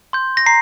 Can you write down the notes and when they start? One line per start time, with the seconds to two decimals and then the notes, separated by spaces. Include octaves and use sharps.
0.13 C6 G6
0.37 A#6
0.46 A#5 C7